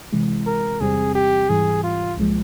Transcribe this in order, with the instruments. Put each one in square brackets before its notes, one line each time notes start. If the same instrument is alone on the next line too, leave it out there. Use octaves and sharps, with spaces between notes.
[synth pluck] C3 E3 G#3
[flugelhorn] A#4
[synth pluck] E2 C3 G3 C4 [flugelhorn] G#4
[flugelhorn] G4
[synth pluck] G#2 E3 G3 [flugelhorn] G#4
[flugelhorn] F4
[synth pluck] C2 A#2 F3 G#3